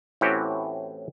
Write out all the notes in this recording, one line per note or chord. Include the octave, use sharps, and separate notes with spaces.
A2 E3 C4 C#4 F#4 G4